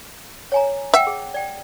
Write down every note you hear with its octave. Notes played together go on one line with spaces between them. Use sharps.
C#5 G#5 A#5
E5 F#5 G5
G#4
D5 G5